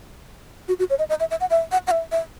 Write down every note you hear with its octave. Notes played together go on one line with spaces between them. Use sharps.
F#4
F#4
C#5
D#5
D#5
E5
E5
F#5
E5
F#5
F#5
E5
E5